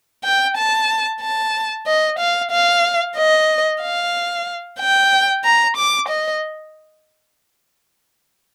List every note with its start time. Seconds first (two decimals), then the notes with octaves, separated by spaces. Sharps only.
0.24 G5
0.57 A5
1.22 A5
1.87 D#5
2.19 F5
2.51 F5
3.17 D#5
3.82 F5
4.79 G5
5.45 A#5
5.77 D6
6.09 D#5